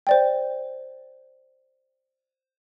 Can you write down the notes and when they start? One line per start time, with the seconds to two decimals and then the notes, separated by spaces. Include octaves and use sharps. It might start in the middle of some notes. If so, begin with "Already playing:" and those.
0.07 C5 D5 G5